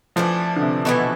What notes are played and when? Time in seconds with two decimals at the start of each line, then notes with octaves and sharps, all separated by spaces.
0.16 E3 F3 A3 D4
0.56 D3
0.62 C3
0.85 B2 E3 B3 E4 A4